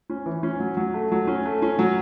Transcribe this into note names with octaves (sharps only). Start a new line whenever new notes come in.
C#4
E3
C#4
F#3
F#3
A3
F#3
C#4
A3
C#4
F#3